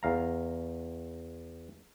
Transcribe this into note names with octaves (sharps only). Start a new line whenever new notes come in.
E2 F5 A#5